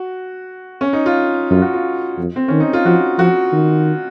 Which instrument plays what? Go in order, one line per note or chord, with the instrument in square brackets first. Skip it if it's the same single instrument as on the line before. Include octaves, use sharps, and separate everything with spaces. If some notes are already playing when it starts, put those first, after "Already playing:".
Already playing: [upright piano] F#4
C#4
D#4
F4
[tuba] F#2 [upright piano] F4
[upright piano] F#4
F4
[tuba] F2
[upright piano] C4
[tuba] D#3 [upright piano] C#4
[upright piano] D#4
F4
[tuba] F3 [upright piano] F#4
[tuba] F3 [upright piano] F#4
[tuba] D#3